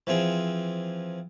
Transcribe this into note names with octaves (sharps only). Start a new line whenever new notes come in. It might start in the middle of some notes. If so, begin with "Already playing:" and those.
E3 F3 C4 G#4